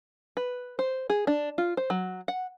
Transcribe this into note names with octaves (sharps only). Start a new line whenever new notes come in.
B4
C5
G#4
D4
F4
C5
F#3
F#5